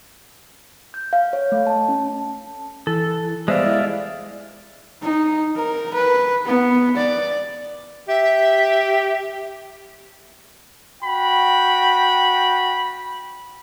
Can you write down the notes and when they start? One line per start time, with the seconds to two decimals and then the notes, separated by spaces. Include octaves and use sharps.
0.94 G6
1.13 F5
1.33 C#5
1.52 A3
1.67 A5
1.89 C#4
2.87 E3 A4
3.48 G3 G#3 B3 C5 D5 E5 F5
3.66 E4
5.03 D#4
5.56 A#4
5.94 B4
6.46 B3
6.97 D5
8.08 G4 E5
11.03 F#4 G5 B5